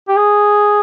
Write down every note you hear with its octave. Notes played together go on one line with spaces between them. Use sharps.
G4
G#4